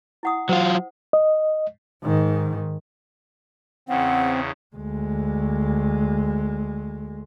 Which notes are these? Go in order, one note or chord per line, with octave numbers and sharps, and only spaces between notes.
E4 F#5 D#6
F#3 F4 C5 F#5
D#5
G#2 D#3
E2 C#3 C4 F#5
D2 G#3